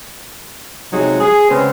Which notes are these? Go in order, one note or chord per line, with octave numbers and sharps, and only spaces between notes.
C3 F#3 G#3 C#4 D#4 G#4
G#4
C#3 G#3 B3 C4